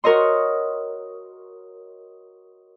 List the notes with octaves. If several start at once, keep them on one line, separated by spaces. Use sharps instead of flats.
F#4 A#4 C#5 D#5 C6